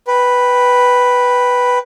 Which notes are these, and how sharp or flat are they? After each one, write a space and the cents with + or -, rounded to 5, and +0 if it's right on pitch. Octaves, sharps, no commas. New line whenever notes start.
B4 +0 G5 +0